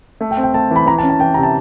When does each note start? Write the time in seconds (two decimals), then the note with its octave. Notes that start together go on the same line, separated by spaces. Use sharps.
0.21 A3
0.31 G5
0.37 C4
0.43 G5
0.54 A3 A5
0.71 E3 B5
0.86 E3 A#5
0.98 A5
1.03 C#4
1.10 A5
1.20 E3 G5
1.34 C3 A#5
1.43 A5